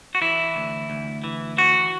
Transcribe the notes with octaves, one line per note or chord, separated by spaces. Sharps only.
F#4
E3 E4
D2
D2
E3
E3 F#4